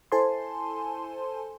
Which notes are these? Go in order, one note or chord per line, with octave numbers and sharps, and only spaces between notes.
E4 A4 C5 G#5 A5 C6